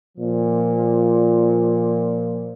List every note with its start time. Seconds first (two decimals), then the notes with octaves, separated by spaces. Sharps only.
0.17 A#2 F3